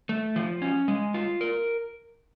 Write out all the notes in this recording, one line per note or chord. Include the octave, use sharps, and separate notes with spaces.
A3
F3
C#4
G#3
F4
A#4